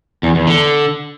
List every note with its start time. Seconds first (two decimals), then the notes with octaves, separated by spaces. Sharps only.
0.23 E2
0.35 E2
0.47 D3